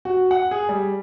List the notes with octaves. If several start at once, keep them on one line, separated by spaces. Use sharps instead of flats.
F#4
F#5
G#4
G3